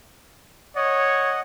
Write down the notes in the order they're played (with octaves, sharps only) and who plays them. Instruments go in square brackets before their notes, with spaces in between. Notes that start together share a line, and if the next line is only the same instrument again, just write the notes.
[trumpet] C#5 [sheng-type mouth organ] D#5 F#5